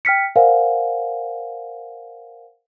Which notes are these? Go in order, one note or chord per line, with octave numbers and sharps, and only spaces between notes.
G5 F6 B6 C#7
A#4 C5 D5 F5 F#5 G#5